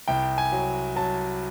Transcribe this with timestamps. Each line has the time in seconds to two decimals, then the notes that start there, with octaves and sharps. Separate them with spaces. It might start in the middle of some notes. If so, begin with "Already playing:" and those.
0.08 C2 G5
0.38 G#5
0.52 F#3
0.96 F#3 A5